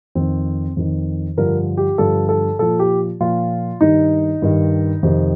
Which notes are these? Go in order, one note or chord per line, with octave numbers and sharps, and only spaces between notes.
F2 D#3 C4
F2 D#3
G2 D3 F3 A#4
G4
G2 D3 F3 A4
A4
A#2 F3 A4
G4
A#2 F3 F4
G2 D#3 D#4
G2 D#3
F2 C3 D#3